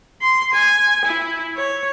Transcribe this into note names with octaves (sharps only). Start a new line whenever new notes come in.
C6
G#5
E4
C#5